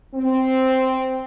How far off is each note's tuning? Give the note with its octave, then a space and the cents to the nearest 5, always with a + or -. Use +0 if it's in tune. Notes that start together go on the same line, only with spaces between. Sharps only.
C4 -5